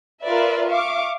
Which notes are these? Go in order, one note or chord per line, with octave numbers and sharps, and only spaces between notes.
F4 A#4 B4 D5 E5
E5 F5 C#6 D6